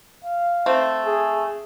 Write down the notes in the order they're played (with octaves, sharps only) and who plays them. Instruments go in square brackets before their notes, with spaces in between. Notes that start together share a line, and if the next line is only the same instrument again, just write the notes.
[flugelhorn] F5
[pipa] A3 C4
[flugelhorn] G#4